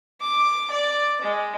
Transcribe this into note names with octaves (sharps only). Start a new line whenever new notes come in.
D6
D5
G#3